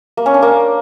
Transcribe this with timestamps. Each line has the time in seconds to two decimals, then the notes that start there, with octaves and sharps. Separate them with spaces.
0.17 A#3
0.26 C#4
0.34 D4
0.42 A#3